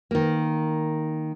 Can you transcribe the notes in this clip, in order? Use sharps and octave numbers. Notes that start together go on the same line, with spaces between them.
D#3 A#3